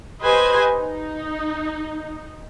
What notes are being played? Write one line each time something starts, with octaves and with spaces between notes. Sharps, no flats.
G4 B4 C5 D#5 G#5
D#4